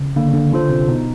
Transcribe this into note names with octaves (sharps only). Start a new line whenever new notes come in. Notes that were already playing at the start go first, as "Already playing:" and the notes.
Already playing: C#3
D3 A#3
D3
D3 D4 F4 A4 C5
C3
B2 D#4